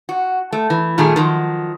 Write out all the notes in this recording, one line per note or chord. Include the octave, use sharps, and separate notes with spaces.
F#4
A3
E3
A#2 D#3 G3 A3 G#4
D#3 F3 F#3